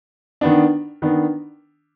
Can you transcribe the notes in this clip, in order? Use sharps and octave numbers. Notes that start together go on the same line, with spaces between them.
D#3 B3 D4
D#3 B3 D4